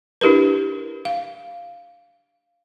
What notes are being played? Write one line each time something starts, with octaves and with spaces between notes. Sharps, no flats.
D4 E4 G4 A#4 B4
F5